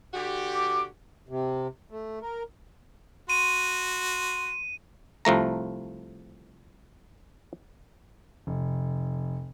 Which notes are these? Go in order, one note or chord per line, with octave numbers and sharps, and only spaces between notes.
D3 F#4 G4
D6
C3
A3
A#4
F#4 C6 D#7
C2 F3 A3 A#5
F1